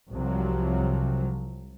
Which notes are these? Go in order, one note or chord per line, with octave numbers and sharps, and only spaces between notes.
C2 C3 F3 F#3